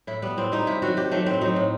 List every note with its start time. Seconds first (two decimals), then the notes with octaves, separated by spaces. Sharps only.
0.07 A2 E4
0.22 G3 B3
0.37 A2 C4
0.52 G3 D#4
0.67 C3 E4
0.82 D#3 F#3 F#4
0.97 C3 G4
1.11 D#3 F#3 A3
1.26 A2 C4
1.41 F#3 D#4
1.56 A2